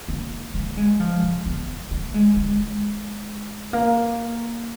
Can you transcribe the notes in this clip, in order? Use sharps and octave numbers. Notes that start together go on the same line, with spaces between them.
A#3
A#3
G#3
F3
C#3
B3
A#3
G#3
G#3
A#3